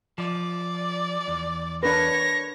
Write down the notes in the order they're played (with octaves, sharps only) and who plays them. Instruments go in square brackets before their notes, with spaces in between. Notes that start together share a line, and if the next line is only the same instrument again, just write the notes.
[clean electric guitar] F3 [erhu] D5
[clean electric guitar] E2
[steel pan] D4 A#4 B4 [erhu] C#5 [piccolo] A#6